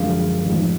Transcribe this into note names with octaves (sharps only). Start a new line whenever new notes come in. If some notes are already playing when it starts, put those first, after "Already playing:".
Already playing: F#2 D3 F3 G#3 F5
A1 G#2 F3